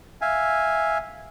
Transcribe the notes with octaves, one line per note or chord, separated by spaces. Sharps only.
E5 F5 G#5